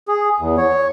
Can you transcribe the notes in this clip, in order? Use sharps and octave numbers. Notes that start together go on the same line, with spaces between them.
G#4
E2
C#5